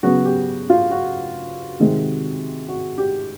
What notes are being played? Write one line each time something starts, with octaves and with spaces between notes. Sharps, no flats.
C#3 F#3 B3 F#4
G4
F4
F#4
C3 D#3 G#3 C4
F#4
G4